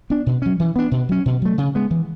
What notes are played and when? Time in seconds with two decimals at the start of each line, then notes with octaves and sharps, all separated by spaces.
0.10 B3 D4
0.26 B2
0.42 F#3 C#4
0.60 E3
0.76 B3 D4
0.91 B2
1.09 F#3 C#4
1.26 B2
1.42 F#3 A3
1.58 C#3
1.75 G#3 B3
1.90 E3